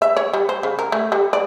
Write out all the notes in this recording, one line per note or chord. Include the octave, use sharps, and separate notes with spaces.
E5
C#5
G3
C5
C#3
A#4
A3
G3
D5